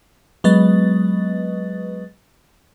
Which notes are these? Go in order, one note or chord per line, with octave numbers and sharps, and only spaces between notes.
F#3 G#3 B3 B4 D#5 A6